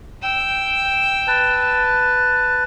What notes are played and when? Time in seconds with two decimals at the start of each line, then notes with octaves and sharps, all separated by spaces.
0.20 G5 E6
1.27 B4 A5